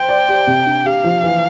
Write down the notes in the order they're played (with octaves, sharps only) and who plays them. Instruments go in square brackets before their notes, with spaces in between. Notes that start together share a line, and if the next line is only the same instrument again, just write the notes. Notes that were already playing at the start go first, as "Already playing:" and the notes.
Already playing: [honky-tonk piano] C5 [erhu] G5
[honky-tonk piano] D5
G4
C3
D4
[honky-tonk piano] G4 [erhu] F5
[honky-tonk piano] F3
E3